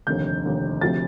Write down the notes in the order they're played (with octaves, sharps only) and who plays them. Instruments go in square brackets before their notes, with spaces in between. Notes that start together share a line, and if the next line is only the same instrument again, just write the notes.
[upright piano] F1 D#2 D3 G6
F1 D#2 D3
D2 C3 F3 A6